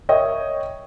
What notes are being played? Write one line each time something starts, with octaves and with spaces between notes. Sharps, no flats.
A#4 C#5 D#5 E5 G5